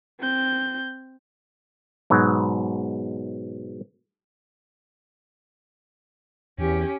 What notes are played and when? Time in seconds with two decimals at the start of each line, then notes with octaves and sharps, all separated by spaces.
0.21 C4 G6
2.10 G#2 B2 F#3
6.59 E2 C#4 G4